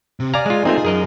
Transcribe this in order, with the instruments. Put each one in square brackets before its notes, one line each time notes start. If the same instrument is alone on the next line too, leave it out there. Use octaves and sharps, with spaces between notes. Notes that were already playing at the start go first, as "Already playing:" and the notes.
[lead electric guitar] C3
[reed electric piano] D5 G#6 [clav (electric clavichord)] F5 A#5 [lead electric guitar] G#5
[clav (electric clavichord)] G#3 F4
[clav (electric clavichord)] A3 A#3 C4 [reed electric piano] D#4 F4 [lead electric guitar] G#4
[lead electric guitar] F#2 [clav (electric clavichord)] G#4 A#4 D#5